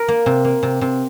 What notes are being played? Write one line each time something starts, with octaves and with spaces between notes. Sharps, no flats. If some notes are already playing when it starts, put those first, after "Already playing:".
Already playing: A#4
A#3
C3
A#3
C3
C3